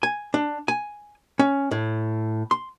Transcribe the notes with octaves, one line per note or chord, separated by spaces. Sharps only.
G#5
D4
G#5
C#4
A2
C6